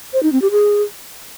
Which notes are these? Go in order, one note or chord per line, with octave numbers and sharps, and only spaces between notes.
C5
D#4
C4
G4
G#4